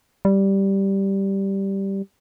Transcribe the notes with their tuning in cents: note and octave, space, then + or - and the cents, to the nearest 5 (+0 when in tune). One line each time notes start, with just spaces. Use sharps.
G3 -5